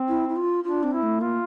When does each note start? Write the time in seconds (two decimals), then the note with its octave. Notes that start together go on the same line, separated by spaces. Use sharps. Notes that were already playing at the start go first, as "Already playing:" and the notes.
Already playing: C4
0.09 E4
0.29 E4
0.36 F4
0.64 D4 F4
0.83 C4
0.93 E4
1.03 A3
1.21 A#3 F4